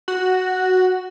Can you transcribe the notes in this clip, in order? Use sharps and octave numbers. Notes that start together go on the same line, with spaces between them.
F#4